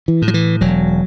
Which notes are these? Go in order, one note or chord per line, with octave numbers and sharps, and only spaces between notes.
E3
A2
F#3
E3
E1 F#3